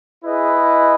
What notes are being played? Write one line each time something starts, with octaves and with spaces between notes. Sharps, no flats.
E4 G#4 B4 D#5